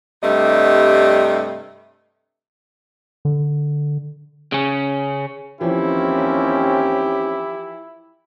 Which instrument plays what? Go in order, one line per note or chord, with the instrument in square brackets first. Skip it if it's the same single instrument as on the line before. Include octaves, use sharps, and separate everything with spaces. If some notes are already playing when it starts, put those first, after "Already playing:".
[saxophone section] G2 C3 G3 A3 D#5
[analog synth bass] D3
[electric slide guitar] C#3 C#4
[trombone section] D#2 C4 C#4 [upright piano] E3 F3 [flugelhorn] E4 [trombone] G4